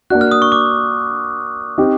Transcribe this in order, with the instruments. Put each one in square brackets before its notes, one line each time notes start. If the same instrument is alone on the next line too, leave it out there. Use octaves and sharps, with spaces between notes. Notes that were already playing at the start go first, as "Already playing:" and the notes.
[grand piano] A#3 D4 F#4 [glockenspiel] F#6
[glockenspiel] F6
D#6
C#6
D6
[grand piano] C4 D#4 G4